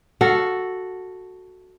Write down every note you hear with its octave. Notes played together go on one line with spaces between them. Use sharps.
F#4 A4 F5